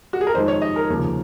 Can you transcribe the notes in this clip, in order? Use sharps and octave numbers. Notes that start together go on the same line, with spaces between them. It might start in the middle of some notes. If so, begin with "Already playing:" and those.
F#4
G#4
A#4
F2 D#3 G#3 C5
C#5
D#5
A#4
F1 D#2 C#3 F3